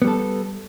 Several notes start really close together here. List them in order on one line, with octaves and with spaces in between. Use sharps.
B3 G3 A4